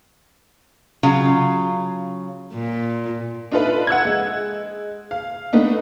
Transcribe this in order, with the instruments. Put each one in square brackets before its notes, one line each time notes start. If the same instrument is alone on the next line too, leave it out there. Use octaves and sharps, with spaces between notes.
[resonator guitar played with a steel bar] C#3 F#3 F4
[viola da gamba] A#2
[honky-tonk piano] D4 D#4 F4 A4 B4 E5
F#5 E6 F#6 G#6
G#3
F5
A3 B3 D4 D#4